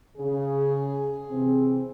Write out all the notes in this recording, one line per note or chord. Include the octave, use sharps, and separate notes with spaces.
C#3 G#4
C3 E3 C4